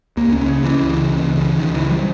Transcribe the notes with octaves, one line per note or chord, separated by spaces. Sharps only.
C#2 A#3
C#4
C#3
C#4
C#2 E3
C#3
C#2
C#3
C#2 D#3
E3
C#3
G3